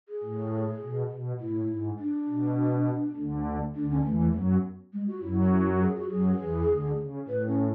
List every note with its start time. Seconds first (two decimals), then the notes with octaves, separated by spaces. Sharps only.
0.09 G#4
0.23 A2
0.82 B2
1.12 B2
1.40 A2 E4
1.69 G#2
1.99 D4
2.28 B2
3.16 D2 D3
3.75 D2 D3 D4
3.90 C#4
4.04 E2 E3 A3
4.19 A3
4.34 F#2 F#3 B3
4.93 G#3
5.08 F#4
5.22 F#2 F#3 E4
5.52 E4
5.67 F#4
5.82 G#4
5.96 F#4
6.10 F#2 F#3 G#4
6.40 E2 E3
6.69 D2 D3
6.98 C#3
7.28 A2 B4
7.47 C#4